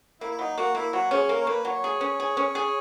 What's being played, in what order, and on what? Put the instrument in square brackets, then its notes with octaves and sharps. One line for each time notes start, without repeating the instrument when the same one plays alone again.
[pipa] A#3 [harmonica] E4
[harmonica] E4
[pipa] F#3 [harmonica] D#4
[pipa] A#3 [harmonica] F#4
[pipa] A#3 [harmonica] E4
[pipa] F#3 [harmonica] F#4
[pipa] C#4 [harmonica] G#4
[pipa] A#3 [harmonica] A#4
[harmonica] C#5
[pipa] A#3 [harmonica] B4
[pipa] F#3 [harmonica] C#5
[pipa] G#4
C#4
G#4
C#4
G#4